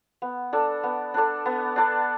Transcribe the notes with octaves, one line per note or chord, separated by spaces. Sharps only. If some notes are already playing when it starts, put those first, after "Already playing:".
B3
D4 A4 D5
B3
D4 A4 D5
B3
D4 A4 D5